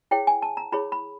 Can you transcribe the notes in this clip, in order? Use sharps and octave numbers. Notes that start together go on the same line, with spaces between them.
E4 G#4 C#5 G5
G#5
A5
A#5
E4 G#4 C#5 B5
B5